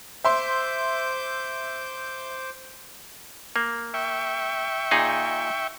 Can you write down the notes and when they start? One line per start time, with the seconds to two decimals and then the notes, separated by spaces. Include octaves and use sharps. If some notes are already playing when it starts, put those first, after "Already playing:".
0.24 C5 E5 C6 D6 G6
3.56 A#3
3.94 E5 G5 C#6
4.91 A#2 D#4 G#4